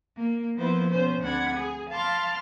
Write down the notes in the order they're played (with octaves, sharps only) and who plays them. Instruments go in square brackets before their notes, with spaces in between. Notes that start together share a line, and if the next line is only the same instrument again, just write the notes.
[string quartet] A#3
F3 A#3 B3 E4 B4 C5
B2 C#4 C5
D2 C4 D4 F#5 B5 G#6
G#4
F5 A5 B5 C6 D6 F6